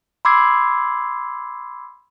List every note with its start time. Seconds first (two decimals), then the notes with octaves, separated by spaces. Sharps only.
0.25 B5 C6 D6 E6 G#6 C7